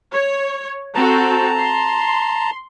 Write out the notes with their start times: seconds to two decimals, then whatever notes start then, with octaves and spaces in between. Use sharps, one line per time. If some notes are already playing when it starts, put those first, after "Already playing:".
0.13 C#5
0.95 C4 F#4 A4 A5 A#5
1.58 C6